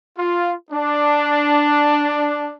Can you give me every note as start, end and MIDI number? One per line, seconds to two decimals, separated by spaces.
0.18 0.52 65
0.71 2.54 62